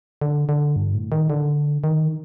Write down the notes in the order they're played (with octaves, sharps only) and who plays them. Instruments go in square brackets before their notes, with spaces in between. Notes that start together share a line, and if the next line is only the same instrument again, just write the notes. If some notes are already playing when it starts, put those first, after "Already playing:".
[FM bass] D3
D3
G2
A2
D#3
D3
D#3